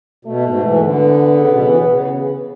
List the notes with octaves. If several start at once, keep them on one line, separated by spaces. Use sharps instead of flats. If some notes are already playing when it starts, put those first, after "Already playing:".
B2 A3
G#2
E3
D3 B3
C#3
B2
F#3
E3
C#3
C#3